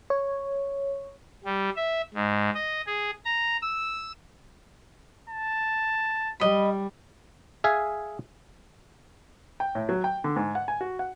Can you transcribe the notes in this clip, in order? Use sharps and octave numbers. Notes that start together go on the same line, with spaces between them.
C#5
G3
E5
G#2
D#5
G#4
A#5
E6
A5
G3 D#5 B5
G#4 E5 F5 G#5
G5
A2
F#3
G5
D3
G#2
F#5
G#5
F#4
F#5